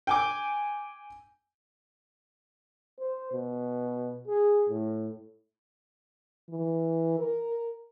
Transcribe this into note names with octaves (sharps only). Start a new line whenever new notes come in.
G5 G#5 D6
C5
B2
G#4
A2
E3
A#4